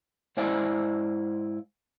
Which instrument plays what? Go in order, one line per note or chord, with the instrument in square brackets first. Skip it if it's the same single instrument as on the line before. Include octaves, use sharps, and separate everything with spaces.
[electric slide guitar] G#2 E4 C5 D5 F5 G#5